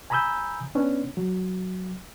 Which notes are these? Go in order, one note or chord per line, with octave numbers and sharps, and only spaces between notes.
G#5 A#5 B5 D#6 E6 G6
B3 C#4 D4
F#3